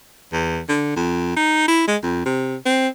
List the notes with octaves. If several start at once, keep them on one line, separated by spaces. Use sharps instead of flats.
E2
D3
F2
D#4
E4
G#3
F2
C3
C4